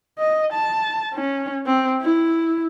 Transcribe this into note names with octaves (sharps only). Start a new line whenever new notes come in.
D#5
A5
C#4
C4
E4